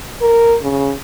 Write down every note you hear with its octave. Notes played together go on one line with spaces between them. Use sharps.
A#4
C#3